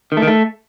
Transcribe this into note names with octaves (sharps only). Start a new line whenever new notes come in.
D#3
A3
D#3
A3